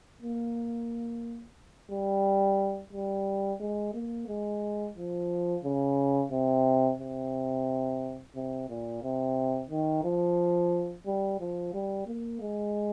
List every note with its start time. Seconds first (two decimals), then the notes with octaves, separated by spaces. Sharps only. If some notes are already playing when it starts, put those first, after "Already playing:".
0.22 A#3
1.91 G3
2.93 G3
3.61 G#3
3.94 A#3
4.28 G#3
4.97 F3
5.64 C#3
6.32 C3
7.00 C3
8.35 C3
8.69 A#2
9.03 C3
9.70 D#3
10.05 F3
11.07 G3
11.40 F3
11.74 G3
12.07 A#3
12.42 G#3